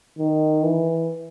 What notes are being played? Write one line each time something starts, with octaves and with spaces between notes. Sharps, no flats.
D#3
E3